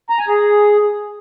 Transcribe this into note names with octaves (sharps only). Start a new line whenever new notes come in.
A#5
G#5
G#4